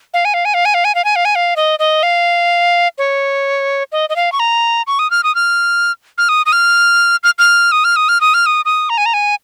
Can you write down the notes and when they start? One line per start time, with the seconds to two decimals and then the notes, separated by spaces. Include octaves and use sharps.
0.14 F5
0.25 G#5
0.34 F5
0.45 G#5
0.54 F5
0.65 G#5
0.74 F5
0.85 G#5
0.95 F5
1.05 G#5
1.16 F5
1.25 G#5
1.35 F5
1.56 D#5
1.79 D#5
2.03 F5
2.98 C#5
3.92 D#5
4.10 D#5
4.16 F5
4.32 C#6
4.40 A#5
4.87 C#6
4.99 D#6
5.11 F6
5.24 D#6
5.35 F6
6.18 F6
6.29 D#6
6.46 D#6
6.52 F6
7.24 F6
7.39 F6
7.72 D#6
7.84 F6
7.96 D#6
8.09 F6
8.21 D#6
8.34 F6
8.46 D#6
8.65 D#6
8.90 A#5
8.98 G#5
9.06 A#5
9.14 G#5